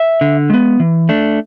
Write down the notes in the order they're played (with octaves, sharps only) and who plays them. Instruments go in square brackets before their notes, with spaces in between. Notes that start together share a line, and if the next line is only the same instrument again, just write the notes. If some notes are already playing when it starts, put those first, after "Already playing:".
Already playing: [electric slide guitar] E5
D3
G#3 B3
E3
A3 D4